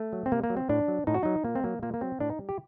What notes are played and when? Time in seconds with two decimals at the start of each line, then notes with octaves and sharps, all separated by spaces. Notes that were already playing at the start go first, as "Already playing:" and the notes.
Already playing: A3
0.13 F#3
0.26 C4
0.32 C3 A#3
0.44 A#3
0.50 F#3
0.57 C4
0.69 A2 D4
0.88 F#3
1.07 A2 D#4
1.14 F#4
1.23 F#3 D#4
1.44 A#2 A#3
1.55 C4
1.64 F#3 A#3
1.82 A#2 A#3
1.94 A#3
2.01 F#3 C4
2.20 A2 D4
2.30 D#4
2.39 G3
2.49 G4